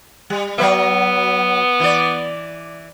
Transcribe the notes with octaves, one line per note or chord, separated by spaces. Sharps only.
G3
F#3 B3 B4 E5
E3 D5